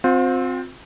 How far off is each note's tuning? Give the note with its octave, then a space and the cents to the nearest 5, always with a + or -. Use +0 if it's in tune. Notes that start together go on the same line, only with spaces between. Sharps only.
C4 +0 F4 +40 C5 +0